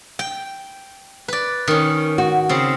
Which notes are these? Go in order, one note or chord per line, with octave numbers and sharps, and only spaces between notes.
G5
B4 D5
D#3 C#4
F#4
C#3 C4